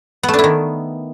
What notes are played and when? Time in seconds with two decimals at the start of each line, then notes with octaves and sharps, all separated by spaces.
0.23 B3
0.28 A3
0.34 D4
0.39 E4
0.44 D#3